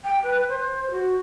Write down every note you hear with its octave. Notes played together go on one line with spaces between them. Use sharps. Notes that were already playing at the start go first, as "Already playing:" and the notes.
G5
B4
C5
F#4